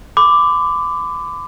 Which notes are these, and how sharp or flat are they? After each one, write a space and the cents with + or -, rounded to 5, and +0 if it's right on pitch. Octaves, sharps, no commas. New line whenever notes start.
B5 +35 D6 +0